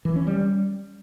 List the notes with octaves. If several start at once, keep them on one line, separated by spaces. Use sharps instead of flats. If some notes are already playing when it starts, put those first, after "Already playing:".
E3
C#4
G3